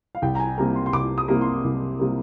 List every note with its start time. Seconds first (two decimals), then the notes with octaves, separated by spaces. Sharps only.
0.15 F5
0.22 C2 G5
0.35 A#5
0.40 G#5
0.58 C3 G3 A#3 A#5
0.75 C6
0.86 C6
0.93 C2 D6
1.18 D#6
1.28 C3 G3 A#3
1.41 C6
1.64 C2
1.99 C3 G3 A#3